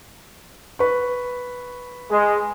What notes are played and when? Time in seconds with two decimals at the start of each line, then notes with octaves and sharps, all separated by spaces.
0.79 B4 C#6
2.11 G#3